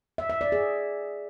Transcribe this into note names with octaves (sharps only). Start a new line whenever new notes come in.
E5
E5
D5
G#4